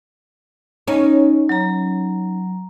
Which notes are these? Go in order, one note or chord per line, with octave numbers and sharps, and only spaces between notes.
C#4 D#4
F#3 A#5